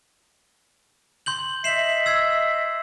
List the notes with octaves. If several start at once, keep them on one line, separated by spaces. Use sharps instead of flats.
C6 G6 F#7
D#5 E5 C7 E7 F#7
E6 G#6 C7